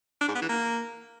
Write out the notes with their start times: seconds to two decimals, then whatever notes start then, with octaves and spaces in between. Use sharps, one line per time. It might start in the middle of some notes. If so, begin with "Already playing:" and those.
0.21 D4
0.28 G#2
0.35 B3
0.42 E3
0.49 A#3